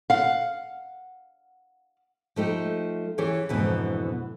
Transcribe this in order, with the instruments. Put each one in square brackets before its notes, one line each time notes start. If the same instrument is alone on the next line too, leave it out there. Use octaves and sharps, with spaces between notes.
[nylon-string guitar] F5 F#5
F3 A3 D#4 G4
E3 C#4 G4 G#4 C#5
F2 G#2 B2 D3 E3